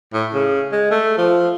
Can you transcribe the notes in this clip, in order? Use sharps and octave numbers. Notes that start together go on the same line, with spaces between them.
A2
C#3
G#3
A3
F3